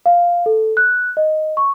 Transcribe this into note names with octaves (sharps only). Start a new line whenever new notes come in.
F5
A4
F#6
D#5
C#6